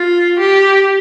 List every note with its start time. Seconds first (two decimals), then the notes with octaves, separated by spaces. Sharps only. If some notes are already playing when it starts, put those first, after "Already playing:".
Already playing: F4
0.39 G4